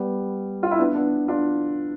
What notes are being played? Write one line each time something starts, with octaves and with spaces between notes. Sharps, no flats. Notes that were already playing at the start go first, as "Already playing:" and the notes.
Already playing: G3 B3
F4
E4
B3 D4
B3 D4
D4 F4